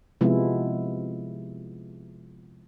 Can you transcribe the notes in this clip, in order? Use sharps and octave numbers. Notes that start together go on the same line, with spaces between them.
C3 F3 G#3 B3 E4